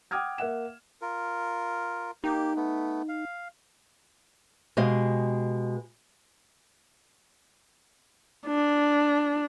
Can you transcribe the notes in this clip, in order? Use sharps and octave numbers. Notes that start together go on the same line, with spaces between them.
F#5 G5 D6 D#6 F6 G#6
A#3 E5 F#5 E7
F4 A#4
A#3 D#4 G4
A3 B3
F5
B2 G#3 G4 D#5 F5
D4